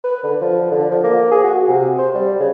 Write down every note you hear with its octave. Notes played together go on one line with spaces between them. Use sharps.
B4
D3
F3
D3
F3
A#3
G#4
F#4
C3
C5
G3
C#3